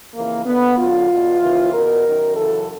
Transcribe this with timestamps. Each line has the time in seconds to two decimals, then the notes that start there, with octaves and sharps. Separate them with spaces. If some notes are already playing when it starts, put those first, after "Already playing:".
0.13 F2 C#3 E3 A#3
0.44 D#2 D3 B3
0.77 F#2 D3 F4
1.08 E2 B2
1.40 D#2 C#3 E3
1.72 E2 B2 A#4
2.03 F#2 D#3
2.35 F#2 C#3 E3 A4